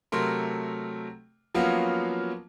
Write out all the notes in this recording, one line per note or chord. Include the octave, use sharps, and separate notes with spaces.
C3 F#3 A3 A#4 C6
F3 F#3 A#3 B3 C#4 F4